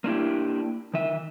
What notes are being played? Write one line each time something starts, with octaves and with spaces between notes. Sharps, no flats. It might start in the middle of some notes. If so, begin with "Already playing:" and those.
A#3 D4 E4 G4
D#3 E5